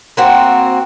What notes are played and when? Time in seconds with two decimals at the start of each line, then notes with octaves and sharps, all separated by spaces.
0.17 A#3 C4 F#4